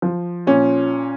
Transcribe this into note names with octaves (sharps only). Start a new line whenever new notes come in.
F3
A#2 C#4